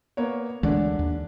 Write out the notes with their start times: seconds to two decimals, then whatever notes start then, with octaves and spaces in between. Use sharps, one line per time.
0.17 A#3 B3 C#5
0.63 D2 D3 E3 G#3 D4
0.99 D#2